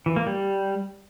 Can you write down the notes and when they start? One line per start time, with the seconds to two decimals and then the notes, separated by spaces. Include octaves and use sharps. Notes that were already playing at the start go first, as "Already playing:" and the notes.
0.06 E3
0.16 A#3
0.27 G3